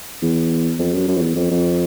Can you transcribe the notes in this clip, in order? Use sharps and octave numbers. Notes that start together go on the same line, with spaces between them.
E2
F2
F#2
F#2
F2
E2
F2
F2